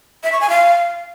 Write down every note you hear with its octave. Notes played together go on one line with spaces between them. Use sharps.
E5
C#6
G#5
F5